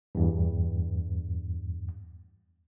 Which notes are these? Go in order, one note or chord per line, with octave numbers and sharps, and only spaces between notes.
E2 G2